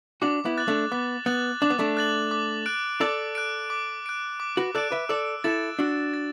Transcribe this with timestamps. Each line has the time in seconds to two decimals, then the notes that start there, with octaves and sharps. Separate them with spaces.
0.22 D4 F#4 D6
0.45 B3 E4
0.57 F#6 A6 F#7
0.68 A3 D4
0.92 B3 D6
1.26 B3 F#6 A6 F#7
1.62 D4 D6
1.70 B3
1.79 A3 D4
1.97 F#6 A6 F#7
2.31 D6
2.66 F#6 D7
3.01 A4 D5 D6
3.35 F#6 D7
3.70 D6
4.06 F#6 D7
4.40 D6
4.57 F#4 B4
4.75 A4 D5 F#6 D7
4.92 B4 E5
5.09 A4 D5 E6
5.44 E4 A4 A6 E7
5.79 D4 F#4 E6
6.14 A6